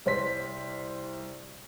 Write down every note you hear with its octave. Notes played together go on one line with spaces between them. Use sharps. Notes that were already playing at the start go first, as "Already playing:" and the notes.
C2 C5 B6